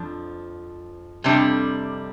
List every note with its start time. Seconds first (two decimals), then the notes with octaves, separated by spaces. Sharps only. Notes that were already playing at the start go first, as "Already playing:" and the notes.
Already playing: F2 F3 D4
1.24 F2 C3 G3 D4